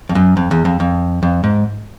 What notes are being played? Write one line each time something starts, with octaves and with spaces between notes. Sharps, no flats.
F2
F#2
F2
E2
F2
F2
F2
G#2